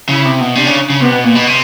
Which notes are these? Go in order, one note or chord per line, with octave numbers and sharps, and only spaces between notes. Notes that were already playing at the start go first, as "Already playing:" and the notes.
C#3 E4
C3
B2
C3 D4
C#3
C#3
C3 B3
B2
A#2
B2
C3